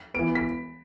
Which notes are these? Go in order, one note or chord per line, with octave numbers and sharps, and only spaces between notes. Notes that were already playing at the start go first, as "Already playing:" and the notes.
E3 B3 D7
B6